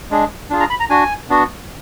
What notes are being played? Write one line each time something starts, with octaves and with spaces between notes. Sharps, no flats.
G#3 D4 G#4
D4 F4 G#4
A#5
B5
A#5
D4 F#4 G#5
B3 D4 F#4